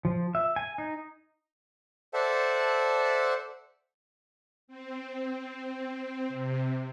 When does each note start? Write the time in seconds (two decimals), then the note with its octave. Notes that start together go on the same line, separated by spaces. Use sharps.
0.05 F3
0.35 E5
0.56 G#5
0.78 D#4
2.14 A4 C5 D5 E5 F#5 A5
4.68 C4
6.29 C3